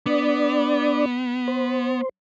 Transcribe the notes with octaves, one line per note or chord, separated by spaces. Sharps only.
B3 D4 D5
C5